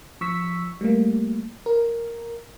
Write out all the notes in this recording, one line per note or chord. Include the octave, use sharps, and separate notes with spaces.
F3 C#6 E6 B6
G3 A3 A#3
A#4